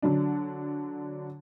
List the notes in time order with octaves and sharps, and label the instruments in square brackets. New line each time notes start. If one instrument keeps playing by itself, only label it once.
[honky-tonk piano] D3 F#3 D4